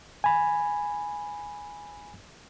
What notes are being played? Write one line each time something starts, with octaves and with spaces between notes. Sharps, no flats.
G#5 B5